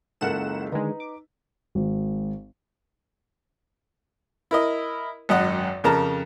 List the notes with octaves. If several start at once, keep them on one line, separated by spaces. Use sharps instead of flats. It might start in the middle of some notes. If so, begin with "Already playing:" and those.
F#1 C#2 A4 A#4 F#5 E7
D3 D#3 G#3 D#4 B4
D6
G#1
E4 A#4 D#5
G#1 F#2 D#5 F#5
F2 C#3 A#4 A5 A#5